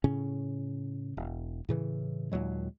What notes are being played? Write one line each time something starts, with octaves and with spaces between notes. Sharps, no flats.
A2 C#3 C#4
E1
A2 C#3 E3
D#2 A#2 F#3 G#3